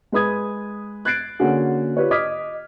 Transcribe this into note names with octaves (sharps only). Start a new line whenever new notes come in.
G#3 B4 B5 D#6 G#6
F#6 G#6 A6 C7 D7
D3 A#3 C#4 F#4 G#4
F4 G4 B4 C#5
D#5 D6 D#6 F6 G#6 B6